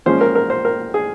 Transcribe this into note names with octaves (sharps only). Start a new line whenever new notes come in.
A#2 F3 G#3 C#4 C5
A#4
A#4
C5
A#4
G#4